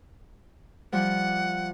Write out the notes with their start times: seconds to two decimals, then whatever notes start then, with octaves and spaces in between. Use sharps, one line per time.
0.92 F3 G3 F#5